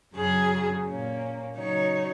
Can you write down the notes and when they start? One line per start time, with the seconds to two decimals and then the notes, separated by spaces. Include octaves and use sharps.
0.15 F#2 C#3 F#3 G#4
0.85 A#2 A#3 C#4
1.56 C#3 F#3 D#4 C#5